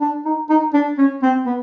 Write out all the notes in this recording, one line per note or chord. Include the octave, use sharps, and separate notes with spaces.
D4
D#4
D#4
D4
C#4
C4
B3